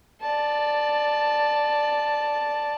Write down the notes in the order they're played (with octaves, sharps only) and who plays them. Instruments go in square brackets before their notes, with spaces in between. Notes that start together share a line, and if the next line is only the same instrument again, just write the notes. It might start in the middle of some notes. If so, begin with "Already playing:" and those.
[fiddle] D5 A5